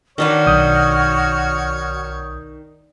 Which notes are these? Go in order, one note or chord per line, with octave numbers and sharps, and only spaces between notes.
D#3 D4 F#4 B4 C#5 F6
B1 D#6 G6